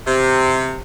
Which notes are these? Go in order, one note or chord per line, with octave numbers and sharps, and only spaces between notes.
C3